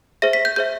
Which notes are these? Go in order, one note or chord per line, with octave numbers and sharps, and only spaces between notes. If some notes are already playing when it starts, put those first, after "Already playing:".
G#4 C5 E5 A#6
B6
G6
G#4 C5 E5 G6